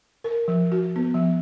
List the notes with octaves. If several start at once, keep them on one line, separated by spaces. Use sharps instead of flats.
A#4
F3
F#4
B3
F3